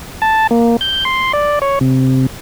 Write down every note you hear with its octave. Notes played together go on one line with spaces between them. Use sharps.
A5
A#3
G6
C6
D5
C#5
C3